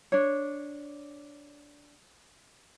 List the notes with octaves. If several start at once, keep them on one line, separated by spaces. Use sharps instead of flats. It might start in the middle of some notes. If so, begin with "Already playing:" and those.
D4 C#5